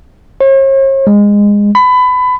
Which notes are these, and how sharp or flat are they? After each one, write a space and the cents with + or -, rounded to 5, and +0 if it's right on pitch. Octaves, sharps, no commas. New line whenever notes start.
C#5 -45
G#3 -20
B5 +25